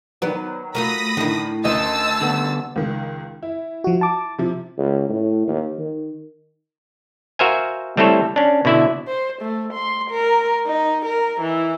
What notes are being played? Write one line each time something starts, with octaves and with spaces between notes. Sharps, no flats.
D#3 F#3 B3 B4 D5
F#3 A3 F4 A#4 B5 D#6 A#6
A2 D3 D#3 E4
D2 D#3 C#4 D#5 A5 C6 E6
D3 B3
C#2 D#3
E4
F3 F#4
A5 D6
C3 F3
C#2
A2
D#2
D#3
F#4 A#4 C5 E5 F5 G#5
G3 A3 C4 E4 A4 C#5
C#4 D4
B2 D3 E4 D5 E5
C5
A3
C6
A#4
D#4
A#4
E3